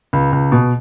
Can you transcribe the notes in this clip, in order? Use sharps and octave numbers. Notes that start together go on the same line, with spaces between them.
C#2
C#2
B2